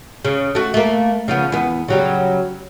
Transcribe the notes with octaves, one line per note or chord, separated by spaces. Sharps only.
C#3
A3 F#4
A3 A#3
C#3 F3 B3
E2 B3
C#3 F#3 G3